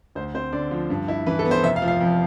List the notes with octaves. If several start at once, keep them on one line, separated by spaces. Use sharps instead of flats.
D2 C5
C4 C5
D3 D5
F3
G2
E4
E3 B4
A4
B3
C5
F1 E5
F5
F3
F5
F2